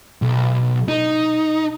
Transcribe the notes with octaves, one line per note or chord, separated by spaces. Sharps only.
B1
D#4